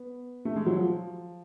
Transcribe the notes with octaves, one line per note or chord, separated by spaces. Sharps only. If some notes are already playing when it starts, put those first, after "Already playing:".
Already playing: B3
A3
G#3
F#3
F3